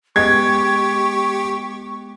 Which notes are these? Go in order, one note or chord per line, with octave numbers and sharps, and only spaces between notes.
G#3 B3 G4 D#5 C#6 G#6